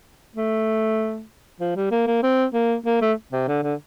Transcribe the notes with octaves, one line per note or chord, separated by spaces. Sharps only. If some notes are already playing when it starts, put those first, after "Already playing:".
A3
F3
G3
A#3
A#3
C4
A#3
A#3
A3
C3
D3
D3